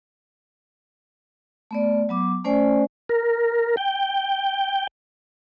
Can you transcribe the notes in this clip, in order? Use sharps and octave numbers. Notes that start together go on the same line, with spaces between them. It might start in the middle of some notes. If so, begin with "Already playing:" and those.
A3 B3 D5
F#3 B3 D6
A3 C#4 C5 D5 G#5
A#4
G5